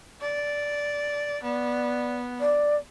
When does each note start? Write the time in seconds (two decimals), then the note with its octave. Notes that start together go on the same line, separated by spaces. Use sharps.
0.21 D5
1.43 B3 D5
2.40 D5